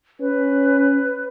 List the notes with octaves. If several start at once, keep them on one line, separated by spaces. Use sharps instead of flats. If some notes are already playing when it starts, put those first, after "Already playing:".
C#4 B4